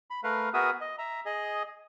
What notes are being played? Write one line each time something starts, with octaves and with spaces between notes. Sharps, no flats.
B5
A3 A#4 B4 F5
B3 F#4 G#4 A#4 E5 D#6
D#5
E5 A#5
G#4 D#5